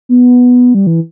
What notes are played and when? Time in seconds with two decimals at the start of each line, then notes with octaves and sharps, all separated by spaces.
0.09 B3
0.74 G3
0.87 E3